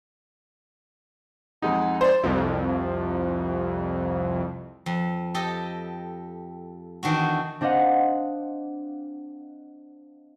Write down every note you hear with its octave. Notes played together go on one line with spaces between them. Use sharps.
F2 G#3 D#4 F#5
C5 D5
C2 F2
F2
G4 A4 D#5
E2 D#3 D4 F#4
C4 D4 C5 D#5 F5 F#5